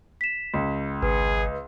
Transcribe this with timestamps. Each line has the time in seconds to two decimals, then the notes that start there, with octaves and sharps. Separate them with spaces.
0.21 B6 E7
0.54 C#2
1.03 G#1 G#4 B4